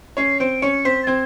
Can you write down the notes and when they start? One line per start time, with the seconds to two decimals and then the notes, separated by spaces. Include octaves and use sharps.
0.17 C#4 C#5 C7
0.40 C4 C5 D7
0.62 C#4 C#5 C#7
0.85 C4 C5 B6
1.03 A6
1.07 C4 C5 G#6